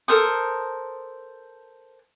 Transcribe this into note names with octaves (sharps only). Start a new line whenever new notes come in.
A4 A#4 C5 D#6